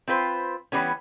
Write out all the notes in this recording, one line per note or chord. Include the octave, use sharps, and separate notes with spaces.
C4 F4 B4 C5
E3 G3 B3 C#4